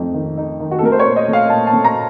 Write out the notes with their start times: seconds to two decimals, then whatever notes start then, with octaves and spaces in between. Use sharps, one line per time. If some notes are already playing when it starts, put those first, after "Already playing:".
Already playing: F2 A3 D#4
0.14 D#3
0.38 D#4
0.60 D#3
0.71 F#4
0.79 A4
0.83 A3 A#4
0.92 C5
1.00 C#5
1.05 A#2
1.16 D#5
1.28 A3 F5
1.50 A#2 A5
1.67 A5
1.73 A3
1.85 A#5